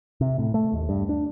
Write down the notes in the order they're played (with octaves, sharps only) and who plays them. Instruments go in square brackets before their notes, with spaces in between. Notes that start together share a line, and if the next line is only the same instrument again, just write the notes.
[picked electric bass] C3
A2
A3
D#2
G2
D4